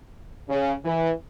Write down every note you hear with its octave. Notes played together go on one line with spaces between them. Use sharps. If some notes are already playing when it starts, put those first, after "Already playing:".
C#3
E3